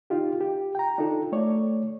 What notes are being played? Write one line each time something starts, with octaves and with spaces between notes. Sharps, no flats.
D#4 F4 G4
G4
G5 A#5
D4 D#4 F4 A4
A3 C#5 D5